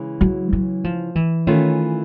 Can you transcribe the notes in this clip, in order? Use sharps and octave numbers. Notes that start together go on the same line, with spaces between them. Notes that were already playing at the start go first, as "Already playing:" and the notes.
Already playing: C#3 E3 G#3
F#3
F#3
F3
E3
D#3 E3 A3 C#4 F4